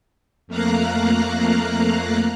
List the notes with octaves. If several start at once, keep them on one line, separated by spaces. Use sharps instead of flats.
F2 A3 A#3 F5 A#5 F#6